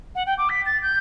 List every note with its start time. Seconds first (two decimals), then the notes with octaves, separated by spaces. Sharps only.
0.15 F#5
0.26 G5
0.37 D6
0.49 B6
0.65 A6
0.82 G6